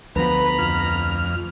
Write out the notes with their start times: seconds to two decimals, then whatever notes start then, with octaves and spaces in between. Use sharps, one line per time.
0.16 D2 F3 B3 B4 A#5 B5
0.59 F2 F6